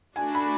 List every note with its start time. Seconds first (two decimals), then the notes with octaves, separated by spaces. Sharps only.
0.16 A3 D4 F#4 G#5
0.35 B5